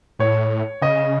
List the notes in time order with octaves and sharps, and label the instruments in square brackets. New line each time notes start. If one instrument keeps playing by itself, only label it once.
[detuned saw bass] A2 [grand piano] C#5
[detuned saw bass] C#3 [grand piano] D#5